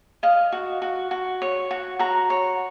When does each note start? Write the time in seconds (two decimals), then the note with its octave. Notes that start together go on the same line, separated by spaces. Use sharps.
0.23 D#5 F5
0.52 F#4
0.82 F#4
1.11 F#4
1.42 C#5
1.71 F#4
1.99 F#4 A#5
2.30 C#5